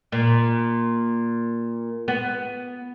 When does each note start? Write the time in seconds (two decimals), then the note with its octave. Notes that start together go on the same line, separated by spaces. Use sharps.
0.12 A#2
2.08 B3